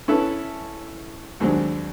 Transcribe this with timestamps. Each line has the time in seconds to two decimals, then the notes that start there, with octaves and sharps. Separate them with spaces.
0.08 C#4 E4 A4 B4
1.40 D#2 F#3 G#3 C4 D4